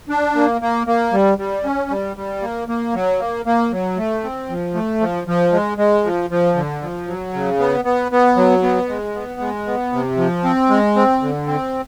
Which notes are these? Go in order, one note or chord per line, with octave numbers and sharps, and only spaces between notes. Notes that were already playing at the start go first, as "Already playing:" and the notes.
D4
A#3
A#3
A#3
G3
G3
C#4
G3
G3
A#3
A#3
F#3
A#3
A#3
F#3
A3
C4
F3
A3
F3
F3
G#3
G#3
F3
F3
D3
F3
F#3
C#3
B3
B3
B3
F#3
B3
G#3
B3
G#3
B3
C3
F3
C4
G#3
C4
D3
C4